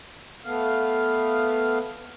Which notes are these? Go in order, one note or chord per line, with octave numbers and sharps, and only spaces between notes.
A3 B3 F5